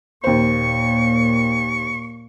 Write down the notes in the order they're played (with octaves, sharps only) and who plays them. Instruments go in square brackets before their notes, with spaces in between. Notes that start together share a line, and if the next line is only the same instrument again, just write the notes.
[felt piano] D#2 C5 [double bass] A#2 A#3 [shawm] C#6